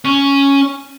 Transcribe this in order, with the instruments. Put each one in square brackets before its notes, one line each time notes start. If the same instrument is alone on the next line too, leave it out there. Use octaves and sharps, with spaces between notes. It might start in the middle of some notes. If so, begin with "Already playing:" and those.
[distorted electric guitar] C#4